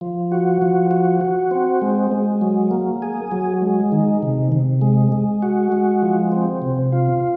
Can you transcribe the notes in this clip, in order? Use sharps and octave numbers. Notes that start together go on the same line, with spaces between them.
F3
F#4
F3
F#4
F#4
C4
G#3
G#3
F#3
A#3
G#4
F#3
G#3
D#3
C3
C3
G#3
G#3
F#4
G#3
F3
C4
C3
F4